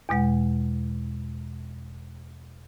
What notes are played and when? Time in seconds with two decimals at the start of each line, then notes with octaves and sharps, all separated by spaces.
0.09 E2 B2 G#3 F#5